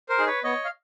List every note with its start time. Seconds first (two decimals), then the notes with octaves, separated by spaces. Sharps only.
0.09 A#4 C5
0.18 D#4 G#4
0.27 B4 C#5
0.44 B3 C#5 D#5
0.65 F5